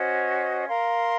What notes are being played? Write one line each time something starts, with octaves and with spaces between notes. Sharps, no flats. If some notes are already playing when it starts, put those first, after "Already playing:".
Already playing: C#4 F#4 C5 D#5
A#4 F5 C6